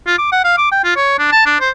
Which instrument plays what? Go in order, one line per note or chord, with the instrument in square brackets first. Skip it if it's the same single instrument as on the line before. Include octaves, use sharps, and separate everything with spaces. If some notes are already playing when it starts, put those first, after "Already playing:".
[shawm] F4
D6
F#5
F5
D6
G5
F4
C#5
D4
A5
D4
C5